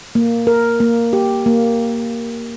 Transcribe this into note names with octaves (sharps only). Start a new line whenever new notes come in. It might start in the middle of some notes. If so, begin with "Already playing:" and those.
A#3
A#4
A#3
G4
A#3